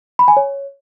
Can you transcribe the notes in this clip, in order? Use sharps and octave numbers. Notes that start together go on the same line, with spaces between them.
B5
G#5
C#5